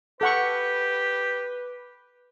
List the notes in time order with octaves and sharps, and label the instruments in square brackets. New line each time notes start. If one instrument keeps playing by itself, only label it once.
[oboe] G4 [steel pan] A4 F#5 C#6 [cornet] B4